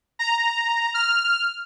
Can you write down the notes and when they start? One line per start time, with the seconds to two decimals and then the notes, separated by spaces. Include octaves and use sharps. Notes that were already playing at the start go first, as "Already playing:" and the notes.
0.19 A#5
0.94 F6